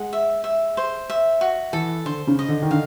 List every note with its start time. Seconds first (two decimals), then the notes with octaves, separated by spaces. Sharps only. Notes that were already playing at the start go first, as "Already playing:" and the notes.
Already playing: G#3 F#5
0.13 E5
0.44 E5
0.77 C5
1.10 E5
1.41 F#4
1.73 E3 A4
2.05 D3 C5
2.27 C#3
2.39 D#5
2.48 D3
2.62 D#3
2.71 D3 F5